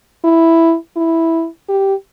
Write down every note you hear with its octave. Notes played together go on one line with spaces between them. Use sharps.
E4
E4
G4